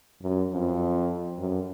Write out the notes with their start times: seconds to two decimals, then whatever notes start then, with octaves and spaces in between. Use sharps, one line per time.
0.22 F#2
0.52 F2
1.38 F#2